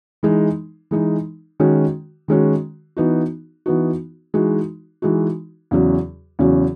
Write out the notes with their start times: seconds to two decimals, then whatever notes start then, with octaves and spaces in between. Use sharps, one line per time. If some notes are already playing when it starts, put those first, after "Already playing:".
0.23 E3 G#3 D#4
0.91 E3 G#3 D#4
1.60 D#3 G#3 C#4 F#4
2.28 D#3 G#3 C#4 F#4
2.97 E3 B3 D#4 F#4
3.66 E3 B3 D#4 F#4
4.34 E3 G#3 D#4 F#4
5.02 E3 G#3 D#4 F#4
5.71 E2 C#3 F#3 C#4 F#4
6.39 E2 C#3 F#3 C#4 F#4